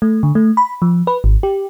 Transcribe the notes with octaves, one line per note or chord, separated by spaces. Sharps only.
A3
D3
A3
B5
F3
B4
G#1
G4